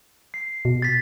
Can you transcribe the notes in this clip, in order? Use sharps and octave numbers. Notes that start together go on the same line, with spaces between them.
C7
B2
A6 B6